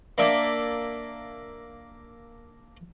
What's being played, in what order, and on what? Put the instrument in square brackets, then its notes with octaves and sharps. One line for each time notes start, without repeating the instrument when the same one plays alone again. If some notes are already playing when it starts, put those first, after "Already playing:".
[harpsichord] A#3 D4 E5 A5